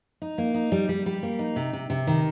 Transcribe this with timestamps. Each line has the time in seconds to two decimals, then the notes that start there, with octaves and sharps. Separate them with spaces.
0.22 D#4
0.38 A#3
0.54 D#4
0.72 G3
0.89 G3
1.06 G3
1.23 A#3
1.39 D#4
1.56 C3
1.73 C3
1.90 C3
2.07 D#3